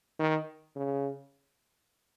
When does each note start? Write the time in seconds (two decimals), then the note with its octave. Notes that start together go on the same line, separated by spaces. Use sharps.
0.19 D#3
0.76 C#3